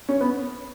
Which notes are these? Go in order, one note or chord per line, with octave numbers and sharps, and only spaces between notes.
C#4
B3